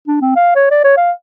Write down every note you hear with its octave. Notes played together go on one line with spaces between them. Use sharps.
D4
C4
F5
C#5
D5
C#5
F5